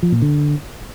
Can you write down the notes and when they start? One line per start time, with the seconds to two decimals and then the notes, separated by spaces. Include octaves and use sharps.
0.03 F3
0.12 A#2
0.22 D3